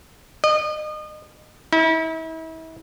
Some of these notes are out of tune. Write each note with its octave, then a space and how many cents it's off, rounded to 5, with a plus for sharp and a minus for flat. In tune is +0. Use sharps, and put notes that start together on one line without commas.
D#5 -35
E4 -40